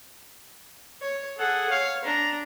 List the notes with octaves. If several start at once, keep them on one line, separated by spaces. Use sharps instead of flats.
C#5
G#4 A4 F#5
C#5 F5
D4 A#5